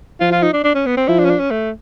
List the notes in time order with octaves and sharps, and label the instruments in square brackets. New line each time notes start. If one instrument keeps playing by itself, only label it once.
[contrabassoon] F3 [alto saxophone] F4
[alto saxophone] F4
D#4
D4
D4
C#4
B3
C4
[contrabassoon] F3 [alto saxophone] E4
[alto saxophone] D4
C#4
D4
C#4
A3